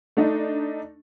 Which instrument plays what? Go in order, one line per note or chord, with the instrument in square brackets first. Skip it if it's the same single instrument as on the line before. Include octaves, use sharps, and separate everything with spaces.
[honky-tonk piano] A3 D4 D#4